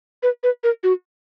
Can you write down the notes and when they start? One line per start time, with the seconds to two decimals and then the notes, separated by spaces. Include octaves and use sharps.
0.23 B4
0.43 B4
0.64 A#4
0.83 F#4